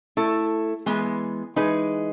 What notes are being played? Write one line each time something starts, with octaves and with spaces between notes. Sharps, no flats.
A3 E4 A4
E3 G#3 B3
E3 G#3 D#4 G#4 B4